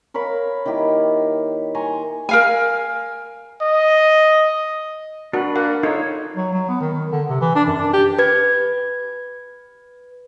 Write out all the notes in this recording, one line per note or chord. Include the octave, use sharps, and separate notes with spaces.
A#4 C#5 F5 B5
D#3 A#3 E4 G4
G#5 A#5 C6 C#6
A#4 F5 G#5
D#5
D4 F#4 A#4 B4
A#3 F#5
D#4 F4 A4 C#5
F#3
F#3
B3
D#3
D#3
D3
C3
E3
D4
F#2
D4
G4
B4 G#6